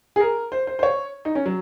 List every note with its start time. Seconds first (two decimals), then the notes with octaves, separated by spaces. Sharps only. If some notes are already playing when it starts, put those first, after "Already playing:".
0.16 G#4
0.20 A#4
0.52 C5
0.67 C5
0.79 C5
0.83 C#5
1.25 D#4
1.35 C#4
1.46 F#3